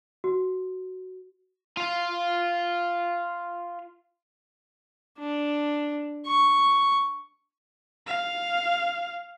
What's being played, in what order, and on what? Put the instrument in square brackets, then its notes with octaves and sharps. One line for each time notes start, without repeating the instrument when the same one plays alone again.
[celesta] F#4
[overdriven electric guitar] F4 F5
[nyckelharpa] D4
C#6
[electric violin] F5